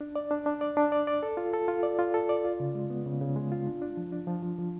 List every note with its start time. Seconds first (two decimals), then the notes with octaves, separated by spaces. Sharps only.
0.01 D4
0.16 D5
0.31 D4
0.46 D4
0.61 D5
0.77 D4
0.92 D5
1.07 D5
1.23 A4
1.37 F4
1.53 A4
1.68 F4
1.83 D5
1.99 F4
2.14 A4
2.29 D5
2.44 F4
2.60 C#3
2.75 G#3
2.90 B3
3.06 C#3
3.21 C#3
3.36 G#3
3.52 F4
3.66 D4
3.82 D4
3.97 F3
4.12 D4
4.27 F3
4.43 F3
4.58 F3